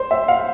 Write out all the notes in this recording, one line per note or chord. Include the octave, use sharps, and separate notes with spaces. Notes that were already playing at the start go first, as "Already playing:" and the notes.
Already playing: C5
E5
F5